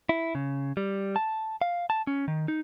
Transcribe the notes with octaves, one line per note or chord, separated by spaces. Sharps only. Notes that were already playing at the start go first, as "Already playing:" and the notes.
E4
C#3
G3
A5
F5
A5
C#4
D#3
D#4